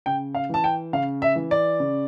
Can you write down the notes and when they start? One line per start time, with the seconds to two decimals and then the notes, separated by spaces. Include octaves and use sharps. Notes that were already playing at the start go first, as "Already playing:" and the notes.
0.06 C#3 G5
0.35 F5
0.49 E3 A5
0.64 G5
0.93 C#3 F5
1.22 E5
1.35 E3
1.51 D5
1.80 C#3